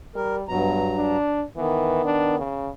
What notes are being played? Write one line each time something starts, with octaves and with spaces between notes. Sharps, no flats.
G3 A#4
G2 B2 F#3 A#5
D4
D#3 E3 B3
D4
C#3